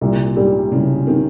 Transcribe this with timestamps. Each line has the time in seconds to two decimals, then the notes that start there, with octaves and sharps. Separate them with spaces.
0.01 C2 A#2
0.36 G#2 G3
0.72 C2 C#3
1.07 C3 D#3